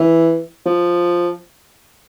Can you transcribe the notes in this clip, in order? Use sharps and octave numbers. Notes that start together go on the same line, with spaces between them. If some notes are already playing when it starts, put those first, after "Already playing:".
Already playing: E3
F3